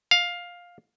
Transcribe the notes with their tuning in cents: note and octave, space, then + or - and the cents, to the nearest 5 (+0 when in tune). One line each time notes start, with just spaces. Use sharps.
F5 +10